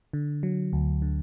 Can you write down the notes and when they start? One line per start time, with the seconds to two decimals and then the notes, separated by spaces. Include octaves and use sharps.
0.13 D3
0.43 F#3
0.73 D2
1.02 D3